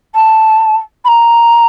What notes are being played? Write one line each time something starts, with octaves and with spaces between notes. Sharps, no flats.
A5
B5
A#5